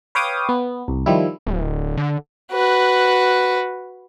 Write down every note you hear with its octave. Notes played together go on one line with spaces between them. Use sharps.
B4 C#5 F5 G5 D6 D#6
B3
C2
D#3 F3 G3 E4
D1
D3
F#4 B4